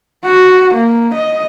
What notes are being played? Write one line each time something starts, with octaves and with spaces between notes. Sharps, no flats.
F#4
A#3
D#5